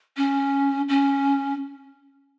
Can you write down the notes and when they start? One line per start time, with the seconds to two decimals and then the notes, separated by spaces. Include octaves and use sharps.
0.16 C#4
0.88 C#4